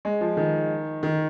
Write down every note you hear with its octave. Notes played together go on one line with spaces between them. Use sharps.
G#3
F3
D#3
D#3